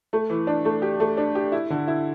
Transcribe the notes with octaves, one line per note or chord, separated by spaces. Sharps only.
A3
E3
D4
A3
G4
A3
D4
G4
E4
D3
E4